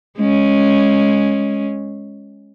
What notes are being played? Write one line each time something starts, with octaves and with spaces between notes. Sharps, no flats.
G#3 C#4